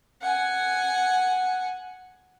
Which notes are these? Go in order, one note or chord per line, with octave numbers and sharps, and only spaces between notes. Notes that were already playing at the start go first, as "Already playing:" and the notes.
F#5 G#5